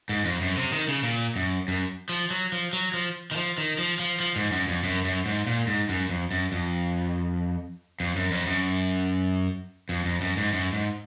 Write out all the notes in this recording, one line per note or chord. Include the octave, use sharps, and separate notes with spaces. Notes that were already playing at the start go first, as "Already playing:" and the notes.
G#2
F2
F#2
C3
D#3
C#3
A#2
F#2
F#2
F3
F#3
F3
F#3
F3
D#3
F3
D#3
F3
F3
F3
G#2
F#2
F2
F#2
F#2
G#2
A#2
G#2
F#2
F2
F#2
F2
F2
F#2
F2
F#2
F2
F2
F#2
G#2
F#2
G#2